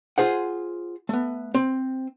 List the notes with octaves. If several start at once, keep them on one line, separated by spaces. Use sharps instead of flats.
F4 G#4 C5 F#5
A3 B3
C4